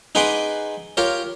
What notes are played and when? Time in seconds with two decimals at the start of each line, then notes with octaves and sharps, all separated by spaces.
0.15 D#4 G#4 B4 F#5 C6 D6
0.97 F4 G4 A#4 C#5